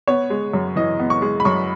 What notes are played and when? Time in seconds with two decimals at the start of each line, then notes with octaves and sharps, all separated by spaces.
0.07 B3 C#5
0.30 G#3
0.53 F#2
0.76 E3 D#5
1.00 B3
1.10 C#6
1.22 G#3
1.40 B5
1.45 F#2 C#6